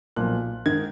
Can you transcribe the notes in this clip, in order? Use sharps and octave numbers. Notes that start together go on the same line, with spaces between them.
B1 A#2 F3 F#6
G#2 D#3 G#6